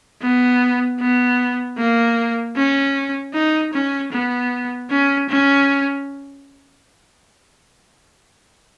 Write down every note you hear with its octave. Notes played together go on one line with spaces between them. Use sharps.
B3
B3
A#3
C#4
D#4
C#4
B3
C#4
C#4